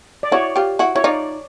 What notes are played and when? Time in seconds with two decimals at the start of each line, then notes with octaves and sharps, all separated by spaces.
0.23 D5
0.32 E4 F#4 C#5
0.56 F4 G4
0.79 E4 F#4
0.95 E4 C#5
1.04 D#4 F4 D5